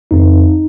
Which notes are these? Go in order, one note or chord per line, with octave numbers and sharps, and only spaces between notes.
G1 F2 D#3 C4 D#4